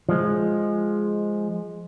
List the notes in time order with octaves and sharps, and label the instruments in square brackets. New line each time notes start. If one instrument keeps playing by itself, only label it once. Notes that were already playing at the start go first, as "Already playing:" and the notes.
[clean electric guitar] F3 G#3